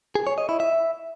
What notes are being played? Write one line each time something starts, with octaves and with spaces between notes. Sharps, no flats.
G#4
C#5
D#5
E4
E5